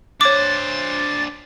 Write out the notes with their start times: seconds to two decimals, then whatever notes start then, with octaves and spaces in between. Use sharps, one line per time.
0.21 D4 C5 C#5 D6 A6